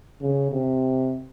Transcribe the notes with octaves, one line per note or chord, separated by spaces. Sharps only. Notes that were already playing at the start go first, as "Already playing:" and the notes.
C#3
C3